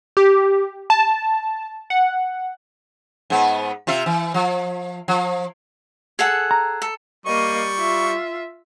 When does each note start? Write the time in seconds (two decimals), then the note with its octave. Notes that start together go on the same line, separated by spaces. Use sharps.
0.17 G4
0.90 A5
1.90 F#5
3.30 G#2 B3
3.87 C3 F4 E5
4.06 E3
4.34 F3
5.08 F3
6.19 G#4 A4 F#5
6.51 A#5
6.82 A4
7.26 G3 A#3 D#5 C#6
7.78 F4 E5